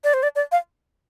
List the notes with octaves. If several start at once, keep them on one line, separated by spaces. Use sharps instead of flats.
D5
C5
D5
D5
F5